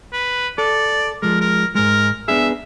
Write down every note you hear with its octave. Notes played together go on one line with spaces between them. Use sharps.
B4
A4 D5
F3 G#3 A#4
A#4
G#2 G#3 A#4
B3 D4 G#4 E5